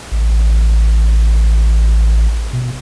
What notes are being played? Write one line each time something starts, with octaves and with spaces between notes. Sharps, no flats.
A1
B2